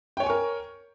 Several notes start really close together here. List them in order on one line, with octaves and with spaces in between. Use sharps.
G5 C#5 G#5 C#6 A#4